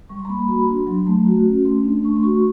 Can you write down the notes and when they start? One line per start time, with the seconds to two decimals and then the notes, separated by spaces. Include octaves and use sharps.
0.09 G3 C#6
0.19 C6
0.25 A#5
0.29 A#3 B5
0.39 A#5
0.48 F#4 B5
0.68 D4 C6
0.87 F#3 C6
1.06 A3 A#5
1.26 F#4
1.46 C#4
1.65 A3 C6
1.84 D4
2.04 A3 C#6
2.16 C6
2.23 F#4 C#6